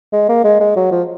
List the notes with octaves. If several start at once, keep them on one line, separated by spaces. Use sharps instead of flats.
G#3
A#3
G#3
G#3
F#3
F3